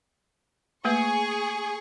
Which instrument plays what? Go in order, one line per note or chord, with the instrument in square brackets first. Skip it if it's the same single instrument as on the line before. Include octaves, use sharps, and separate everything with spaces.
[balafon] A3 A#3 B4 [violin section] G#4 C#6